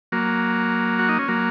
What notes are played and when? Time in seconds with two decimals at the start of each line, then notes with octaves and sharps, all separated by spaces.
0.12 F#3 A#3
0.99 F#4
1.09 D#4
1.19 C#4
1.28 F#3 A#3